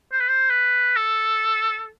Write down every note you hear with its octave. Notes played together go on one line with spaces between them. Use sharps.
C5
B4
C5
B4
A4